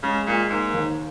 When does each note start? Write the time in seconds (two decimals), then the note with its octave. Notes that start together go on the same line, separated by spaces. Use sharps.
0.03 C#3 G#3
0.27 A#2 G#3
0.50 G#2 A#3
0.73 D#2